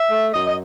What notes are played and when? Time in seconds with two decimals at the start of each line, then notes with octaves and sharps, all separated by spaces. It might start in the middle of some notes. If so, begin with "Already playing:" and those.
Already playing: E5
0.10 A3
0.33 F#2 D#5
0.47 D#5